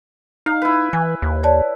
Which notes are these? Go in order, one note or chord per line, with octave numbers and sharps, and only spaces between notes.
D#4 F5
E4 B4
E3 G#5
D#2
C#5 D5 A5